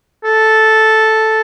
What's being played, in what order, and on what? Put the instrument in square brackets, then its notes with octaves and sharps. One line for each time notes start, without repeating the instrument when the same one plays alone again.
[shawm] A4